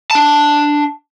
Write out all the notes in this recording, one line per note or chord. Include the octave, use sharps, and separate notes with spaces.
D4 A5